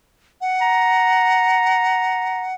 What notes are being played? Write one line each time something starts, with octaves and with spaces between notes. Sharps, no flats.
F#5
A#5